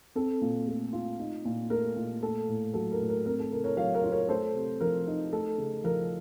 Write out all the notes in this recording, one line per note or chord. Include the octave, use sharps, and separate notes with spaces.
C4 A4
A#2
A3
F4
D#4
A#2
A3 A#4
A#2
A3 A4
A2
F#3 A4
A#4
A2
A#4
C4 A#4
A4
C#3 A#4
A#4 C#5
F#3 C#5 F5
A#4 C#5
F4
A#4 C#5
A3 A4 C5
C3
F3 A#4
D#4
A3 A4
C#3
F3 A#4